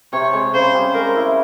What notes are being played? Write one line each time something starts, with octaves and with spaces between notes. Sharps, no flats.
C3 C#5
G#3
C#3 C5
G3
G#3 A#4
E4